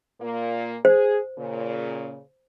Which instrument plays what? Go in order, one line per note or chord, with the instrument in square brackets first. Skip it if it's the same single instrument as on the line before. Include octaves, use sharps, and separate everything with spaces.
[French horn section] A#2 A#3
[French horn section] G#4 [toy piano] C5
[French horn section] A#2 C#3